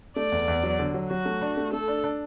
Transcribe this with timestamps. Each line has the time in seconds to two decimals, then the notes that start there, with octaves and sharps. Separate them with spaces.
0.16 A3 D5
0.32 E2
0.48 E2
0.64 F#3
0.79 D3
0.94 F#3
1.10 F#3 F#4
1.26 A3
1.41 D4
1.57 A3
1.73 A3 A4
1.88 D4
2.04 D4